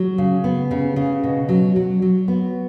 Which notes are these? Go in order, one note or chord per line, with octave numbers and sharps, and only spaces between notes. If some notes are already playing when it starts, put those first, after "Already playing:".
Already playing: F#3
C#3
B3
C#3
C#3
B2
F#3
F#3
F#3
B3